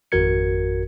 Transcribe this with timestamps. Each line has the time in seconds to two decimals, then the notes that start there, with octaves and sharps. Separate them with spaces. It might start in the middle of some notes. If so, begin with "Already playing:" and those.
0.12 G#1 F2 F#4 A#4 G#6 C#7